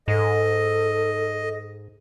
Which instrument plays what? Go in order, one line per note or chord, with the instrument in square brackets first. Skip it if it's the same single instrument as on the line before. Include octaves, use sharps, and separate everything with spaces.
[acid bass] G#2 [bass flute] A4 [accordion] D#5